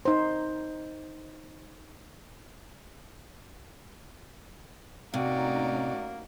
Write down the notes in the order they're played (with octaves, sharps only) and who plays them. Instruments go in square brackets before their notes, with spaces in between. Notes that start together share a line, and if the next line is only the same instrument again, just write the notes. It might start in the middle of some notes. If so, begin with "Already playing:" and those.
[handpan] D#4 C5
[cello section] A2 C#4 D#4 [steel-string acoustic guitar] C3 [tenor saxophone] A#3 [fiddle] F#4 D5